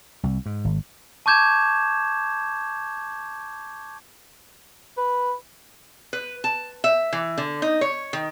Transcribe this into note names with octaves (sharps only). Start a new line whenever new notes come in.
C2
G#2
G#1
A5 C#6 D6 G6 G#6 E7
B4
B4
A5
E5
E3
D3
D#4
C#5
D#3